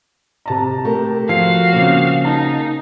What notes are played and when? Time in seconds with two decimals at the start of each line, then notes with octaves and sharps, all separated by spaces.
0.46 C3 A5 A#5
0.85 A3 G4 A#4
1.29 F3 F#4 F5 C7
1.73 C#3 A#3 C4
2.25 D#4 A5